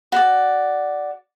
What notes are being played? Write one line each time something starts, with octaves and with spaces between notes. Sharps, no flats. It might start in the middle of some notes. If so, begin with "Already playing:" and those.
F#4 D5